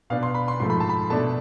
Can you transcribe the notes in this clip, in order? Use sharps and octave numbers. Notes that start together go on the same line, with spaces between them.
B2 B3 D4 F5
C6
B5
C6
G#2 F3 A3 C6
B5
A5
B5
B2 A3 D4 A5